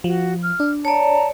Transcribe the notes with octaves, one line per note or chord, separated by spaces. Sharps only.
F3 F#4
F6
D4
C#5 D5 A5 A#5